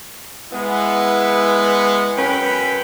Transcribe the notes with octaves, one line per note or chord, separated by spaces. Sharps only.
G#3 B3 E4
F#2 C#4 B4 G5 B5